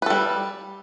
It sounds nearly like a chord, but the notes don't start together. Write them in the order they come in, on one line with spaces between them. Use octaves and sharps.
B4 A4 G3